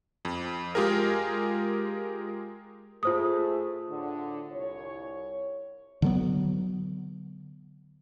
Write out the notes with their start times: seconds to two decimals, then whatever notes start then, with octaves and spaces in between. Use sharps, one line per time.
0.25 F2
0.75 G#3 F4 G4 G#4 A#4
3.03 A3 F4 G#4 C5 D#6
3.89 A2 D3
4.51 C2 C#5
6.02 D3 F#3 B3